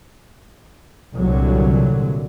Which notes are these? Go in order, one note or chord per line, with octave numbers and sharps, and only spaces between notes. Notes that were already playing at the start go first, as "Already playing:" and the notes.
C2 A#2 D3 F#3